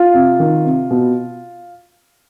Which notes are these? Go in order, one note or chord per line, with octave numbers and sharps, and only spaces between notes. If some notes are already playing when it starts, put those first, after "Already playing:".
Already playing: F4
C3
D#3
C3
B2